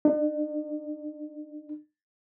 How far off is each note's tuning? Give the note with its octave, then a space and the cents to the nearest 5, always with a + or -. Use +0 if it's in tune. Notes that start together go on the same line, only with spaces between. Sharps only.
D4 +45